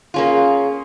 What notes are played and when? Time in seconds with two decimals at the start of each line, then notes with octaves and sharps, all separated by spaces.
0.14 A#3 C#4 F4 G#4